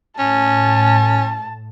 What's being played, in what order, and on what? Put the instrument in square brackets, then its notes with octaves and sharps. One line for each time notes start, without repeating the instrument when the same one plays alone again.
[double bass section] A2 [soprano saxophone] C#4 [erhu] A5